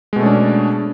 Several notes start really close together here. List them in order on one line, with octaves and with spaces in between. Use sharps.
G#3 B2 A3 C#4 D4